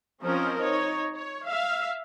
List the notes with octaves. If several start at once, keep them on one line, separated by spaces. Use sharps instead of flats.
F3 C4 C#4 A#4 C5 D#5
D#4 C#5
C#5
E5 F5